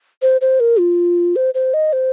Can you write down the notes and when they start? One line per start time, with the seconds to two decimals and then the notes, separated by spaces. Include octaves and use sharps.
0.22 C5
0.41 C5
0.60 A#4
0.79 F4
1.36 C5
1.54 C5
1.74 D#5
1.93 C5